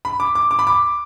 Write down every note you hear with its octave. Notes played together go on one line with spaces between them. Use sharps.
B5
D6
D6
D6
B5
D6